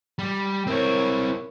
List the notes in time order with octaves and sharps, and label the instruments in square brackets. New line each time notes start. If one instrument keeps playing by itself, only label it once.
[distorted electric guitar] G3
[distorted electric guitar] C4 E4 [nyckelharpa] A#4 C#5